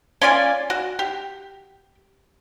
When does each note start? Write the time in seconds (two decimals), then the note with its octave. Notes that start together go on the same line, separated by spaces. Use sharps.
0.21 C#4 F4 D5 G#5
0.70 F#4
0.99 G4